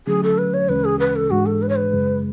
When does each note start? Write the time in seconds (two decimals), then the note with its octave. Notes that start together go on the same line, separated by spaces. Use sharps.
0.07 D3 F#3 A3 C#4 G#4
0.23 A4
0.38 B4
0.54 C#5
0.69 D2 C#3 E3 G#3 C#4 B4
0.85 G#4
0.99 B4
1.16 A4
1.31 G#2 E3 G#3 D4 F#4
1.46 A4
1.62 B4
1.69 C#5
1.76 B4
1.93 F#2 C#3 G#3